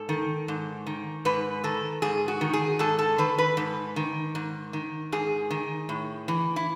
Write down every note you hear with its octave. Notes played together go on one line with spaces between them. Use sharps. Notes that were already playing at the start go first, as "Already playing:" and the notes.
Already playing: G#2 A4
D#3
G#2
D#3
G#2 B4
D#3 A4
G#2 G#4
F#4
D#3
G#4
G#2 A4
A4
D#3 B4
B4
G#2
D#3
G#2
D#3
G#2 G#4
D#3
A2
E3
E4